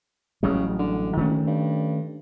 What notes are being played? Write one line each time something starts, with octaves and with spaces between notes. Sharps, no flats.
A1 C#3 F#3 G3
D3
F#1 D#3 A3 C#4
G2